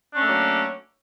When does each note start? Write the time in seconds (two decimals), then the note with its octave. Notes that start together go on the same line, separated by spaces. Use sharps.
0.12 D4
0.16 C#4
0.20 A3
0.24 A#3
0.28 F#3